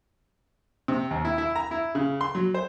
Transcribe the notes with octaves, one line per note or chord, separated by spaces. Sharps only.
C3
D#2
E4
E4
A#5
E4
C#3
C6
F#3
C5